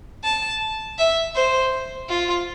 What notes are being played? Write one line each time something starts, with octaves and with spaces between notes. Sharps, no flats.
A5
E5
C5
F4